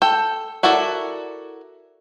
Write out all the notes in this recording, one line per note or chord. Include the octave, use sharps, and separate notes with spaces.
A4 G5
E4 F#4 A4 A#4 D5